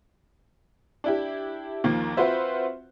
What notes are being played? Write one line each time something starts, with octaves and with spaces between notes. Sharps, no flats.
D4 E4 G4
D#2 D#3 F3 A#3
C4 F4 F#4 B4 C5 E5